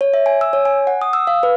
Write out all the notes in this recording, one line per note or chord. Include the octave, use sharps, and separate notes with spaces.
C#5
E5
G#5
E6
C#5
G#5
F#5
D#6
E6
F5
B4